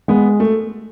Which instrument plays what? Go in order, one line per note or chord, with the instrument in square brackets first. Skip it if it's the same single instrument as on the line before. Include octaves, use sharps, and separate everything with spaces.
[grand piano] G#3 [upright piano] B3
[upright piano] A3